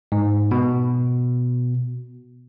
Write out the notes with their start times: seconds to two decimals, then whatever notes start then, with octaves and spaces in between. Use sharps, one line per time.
0.12 G#2
0.51 B2